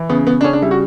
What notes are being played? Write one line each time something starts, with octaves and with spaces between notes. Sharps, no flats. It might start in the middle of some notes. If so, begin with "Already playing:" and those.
Already playing: E3
C#3 B3
C#3 B3
D4
C#3 C#4
D4
G3 E4
F#4